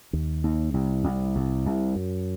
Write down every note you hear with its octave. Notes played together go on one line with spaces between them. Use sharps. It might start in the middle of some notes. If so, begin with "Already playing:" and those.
D#2
D#2
C2
C2
C2
C2
F#2